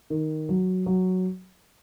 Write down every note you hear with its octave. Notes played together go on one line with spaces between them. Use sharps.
D#3
F#3
F#3